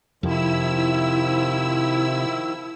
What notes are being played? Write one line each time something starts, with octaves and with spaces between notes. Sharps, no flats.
F2 C3 D#3 F3 E4 E6